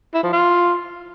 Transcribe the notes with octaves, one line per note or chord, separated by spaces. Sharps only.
E4
F3
F4